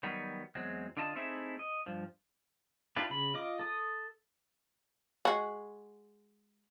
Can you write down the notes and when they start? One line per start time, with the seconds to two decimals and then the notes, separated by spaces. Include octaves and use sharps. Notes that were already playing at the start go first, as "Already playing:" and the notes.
0.03 D#3 F#3 G3 B3
0.55 E2 F#3 G#3 C4
0.97 D3 D4 F4 D#5 A5
1.15 A3 C4 D#4 E4 G#4 E5
1.59 D#5
1.86 G2 F3
2.96 D4 E4 F4 G4 B4
3.10 C#3 B5
3.34 F4 D#5 D6
3.59 A4 D#6
5.25 G#3 F#4